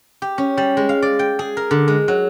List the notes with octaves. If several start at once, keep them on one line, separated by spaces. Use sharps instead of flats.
G4
C#4
G3
G#3
F5
D5
G5
G#4
A#4
D3
G#3
F#3